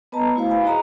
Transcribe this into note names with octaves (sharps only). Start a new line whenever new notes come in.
B3 B4 D#5 A5 A#5
A3 E4 F#4 B4 C5 F5
F5 G#5 B5
D#4 F#4 G#4 D#5 A#5